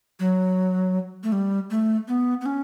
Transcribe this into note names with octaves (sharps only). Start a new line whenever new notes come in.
F#3
A3
G3
A3
B3
B3
C#4